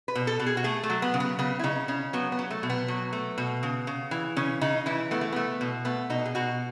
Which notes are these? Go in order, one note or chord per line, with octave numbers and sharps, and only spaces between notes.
B4
B2
A4
B2
G#4
F#4
A3 G#4
A3
F#3
B3
C#3
B3
C#3 B3
E4
C#3 D#4
C#3 C#4
F#3 B3
B3
F#3
A3
B2
B3
F#3
A3
B2
C#3
C#3
E3
C#3 C#4
C#3 D#4
E3 E4
A3 B3
A3
A3 B3
B2
A3 B3
B2 D#4
G#4
B2 F#4